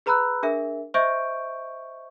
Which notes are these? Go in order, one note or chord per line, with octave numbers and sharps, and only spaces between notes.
G#4 B4 A#5 B5 E6 F#6
D4 G#4 A#4 E5
C5 D#5 E5 C#6 G6 D7